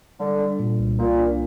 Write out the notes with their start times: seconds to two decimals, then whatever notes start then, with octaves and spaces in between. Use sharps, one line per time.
0.20 D3 G3
0.39 D4
0.60 A#2
0.79 C2
0.99 A#2 A#3
1.19 D4